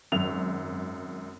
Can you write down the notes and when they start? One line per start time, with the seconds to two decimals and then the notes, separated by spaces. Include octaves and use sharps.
0.12 G#1 F#2 F7